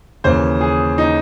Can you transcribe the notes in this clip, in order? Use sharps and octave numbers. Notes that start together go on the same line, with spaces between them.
D#2 C#3 E3 C5
G#4
D#4